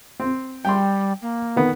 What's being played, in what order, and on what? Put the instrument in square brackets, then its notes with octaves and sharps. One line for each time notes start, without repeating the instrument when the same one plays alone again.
[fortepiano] C4
[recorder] G3 [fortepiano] G5 C6
[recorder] A#3
[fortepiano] D#3 B3